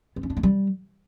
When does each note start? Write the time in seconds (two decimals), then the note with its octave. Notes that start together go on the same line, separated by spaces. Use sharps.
0.16 B3
0.23 C#4
0.30 D4
0.37 A#3
0.43 G3